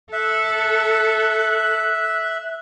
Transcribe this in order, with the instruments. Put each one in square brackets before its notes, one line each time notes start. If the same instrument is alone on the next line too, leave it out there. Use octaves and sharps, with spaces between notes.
[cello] A4 [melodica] E5 [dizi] F#6